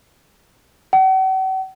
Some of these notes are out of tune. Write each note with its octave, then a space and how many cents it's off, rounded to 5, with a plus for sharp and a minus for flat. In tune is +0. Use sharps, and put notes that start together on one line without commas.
F#5 +45